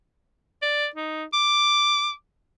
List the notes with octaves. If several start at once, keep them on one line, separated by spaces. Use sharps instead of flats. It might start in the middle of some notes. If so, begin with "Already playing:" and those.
D5
D#4
D6